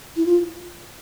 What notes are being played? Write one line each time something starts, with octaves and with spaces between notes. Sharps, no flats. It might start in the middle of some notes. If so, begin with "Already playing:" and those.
E4
F4